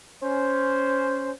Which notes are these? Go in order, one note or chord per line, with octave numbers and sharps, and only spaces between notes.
C#4 C5